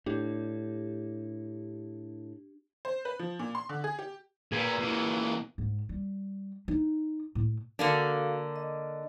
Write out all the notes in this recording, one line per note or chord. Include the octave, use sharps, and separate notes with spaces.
A2 D4 G4
C5
B4
F3
A#2
C6
D3
G#4
G4
A#2 G#4 B4
A#2 E3
G#2
G3
D#4
A2
D3 A#3 D4 F#4 A4 F5
D#5